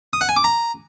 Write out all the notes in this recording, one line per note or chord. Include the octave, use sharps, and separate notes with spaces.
D#6
F#5
G#5
D6
A#5